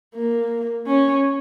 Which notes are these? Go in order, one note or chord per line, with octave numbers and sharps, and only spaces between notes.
A#3
C#4